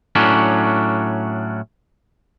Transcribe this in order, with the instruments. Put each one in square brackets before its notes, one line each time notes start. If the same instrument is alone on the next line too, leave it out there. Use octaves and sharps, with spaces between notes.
[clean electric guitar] A2 F#3 C#4 D4